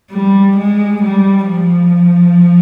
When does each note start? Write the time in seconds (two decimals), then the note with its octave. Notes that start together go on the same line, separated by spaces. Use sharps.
0.11 G3
0.57 G#3
1.03 G3
1.49 F3